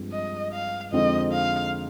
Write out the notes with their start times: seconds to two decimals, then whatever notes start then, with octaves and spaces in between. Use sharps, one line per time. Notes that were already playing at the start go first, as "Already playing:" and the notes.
Already playing: G2 F3 G#3 C4
0.12 D#5
0.53 F5
0.92 F2 D3 G#3 C4 D#4 D#5
1.32 F5